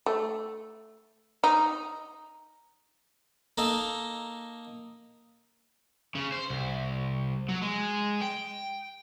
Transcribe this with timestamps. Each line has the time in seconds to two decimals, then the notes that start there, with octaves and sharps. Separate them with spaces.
0.06 A3
1.44 D#4
3.58 A#3 D#4 A4
6.15 C#3
6.32 C5
6.50 C2
7.49 F#3
7.62 G#3
8.21 G5